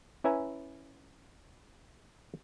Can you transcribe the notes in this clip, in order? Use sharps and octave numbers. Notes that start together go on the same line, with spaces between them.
C#4 E4 B4 E5 G#5 A#5